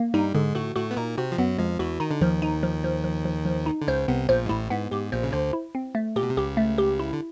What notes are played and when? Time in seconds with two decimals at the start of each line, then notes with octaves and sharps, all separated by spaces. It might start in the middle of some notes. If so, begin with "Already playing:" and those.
Already playing: A#3
0.14 G2 G3 D#4
0.34 G#2 D3 G#3
0.55 A2 A3 F#4
0.76 A2 A3 F#4
0.91 B3
0.97 A#2 A#3 D#4
1.18 C3 C4 F#4
1.32 F3
1.38 F#2 F#3 B3
1.58 F2 F3 G#3
1.79 E2 E3 F#4
2.00 D#3 D#4
2.11 D3
2.21 D#2 D#3 F3
2.42 D#4
2.63 F3
2.84 F3
3.04 F3
3.25 F3
3.45 F3
3.66 D#4
3.82 D3
3.87 C#2 C#3 C5
4.08 C2 C3 B3
4.29 A#1 A#2 C5
4.46 G#2
4.49 A1 A2 E4
4.70 G#2 B3
4.91 G#2 G4
5.12 A#1 A#2 C5
5.23 C#3
5.32 D2 D3 C5
5.53 E4
5.75 C4
5.95 A3
6.16 A#2 G4
6.23 B2
6.30 C3
6.37 C#2 C#3 G4
6.57 A3
6.78 G4
7.00 E4
7.13 D3